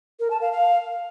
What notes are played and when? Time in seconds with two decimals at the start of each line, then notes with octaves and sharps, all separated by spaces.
0.20 A#4
0.30 A5
0.41 F5
0.52 F5